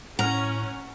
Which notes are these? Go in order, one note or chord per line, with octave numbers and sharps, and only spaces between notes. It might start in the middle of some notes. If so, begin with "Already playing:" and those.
A2 C#4 F#5 A#5 F6